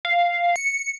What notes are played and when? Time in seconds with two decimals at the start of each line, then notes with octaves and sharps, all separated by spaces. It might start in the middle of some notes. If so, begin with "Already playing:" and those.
0.05 F5
0.56 C#7